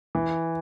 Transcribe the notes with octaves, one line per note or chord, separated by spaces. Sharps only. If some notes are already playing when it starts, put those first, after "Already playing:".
E3